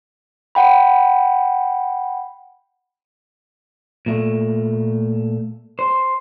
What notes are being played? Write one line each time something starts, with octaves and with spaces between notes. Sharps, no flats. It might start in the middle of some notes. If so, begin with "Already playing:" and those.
F#5 G5 B5
A#2 A3
C5